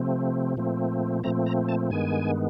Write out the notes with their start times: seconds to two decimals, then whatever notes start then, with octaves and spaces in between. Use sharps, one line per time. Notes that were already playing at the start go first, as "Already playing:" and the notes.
Already playing: C3 F3 A3 C4
0.57 A#2 F3 A3 C4
1.24 A#2 F3 A3 C4 A#5
1.46 A#5
1.68 A5
1.90 G2 D#3 G#3 B3 G#5